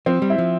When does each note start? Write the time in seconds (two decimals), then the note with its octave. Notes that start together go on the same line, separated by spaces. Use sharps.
0.06 F3 C4
0.22 G3
0.30 E4
0.38 F3